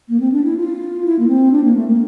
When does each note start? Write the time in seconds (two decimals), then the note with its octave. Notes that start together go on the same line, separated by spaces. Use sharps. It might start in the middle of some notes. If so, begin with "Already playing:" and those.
0.09 A#3
0.20 C4
0.32 D4
0.44 E4
0.57 F4
1.05 E4
1.19 A#3
1.28 C4
1.52 D4
1.64 A#3
1.76 A3
1.88 A#3